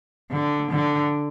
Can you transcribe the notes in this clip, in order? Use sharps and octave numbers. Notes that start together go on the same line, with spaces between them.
D3
D3